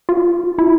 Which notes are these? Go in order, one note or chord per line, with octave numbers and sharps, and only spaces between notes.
F4
E4